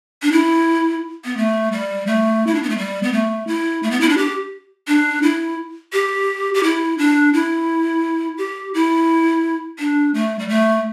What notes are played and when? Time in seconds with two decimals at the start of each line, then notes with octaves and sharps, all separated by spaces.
0.23 D4
0.32 E4
1.25 B3
1.37 A3
1.72 G3
2.07 A3
2.47 E4
2.55 D4
2.63 B3
2.70 A3
2.78 G3
3.03 B3
3.13 A3
3.47 E4
3.83 A3
3.91 B3
4.01 E4
4.09 D4
4.18 G4
4.88 D4
5.23 E4
5.93 G4
6.54 G4
6.63 E4
6.98 D4
7.34 E4
8.38 G4
8.74 E4
9.79 D4
10.14 A3
10.39 G3
10.49 A3